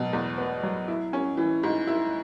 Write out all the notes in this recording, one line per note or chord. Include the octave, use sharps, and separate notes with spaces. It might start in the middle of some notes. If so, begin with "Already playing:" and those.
Already playing: B2 F#3
E2
B3
F#3
E4
C#4
E3
G#2
E4